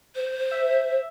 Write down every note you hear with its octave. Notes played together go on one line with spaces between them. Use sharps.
C5
E5